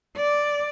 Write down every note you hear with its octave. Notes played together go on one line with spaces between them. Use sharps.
D5